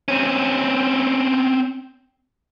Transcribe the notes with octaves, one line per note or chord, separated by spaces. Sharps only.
C4 C#4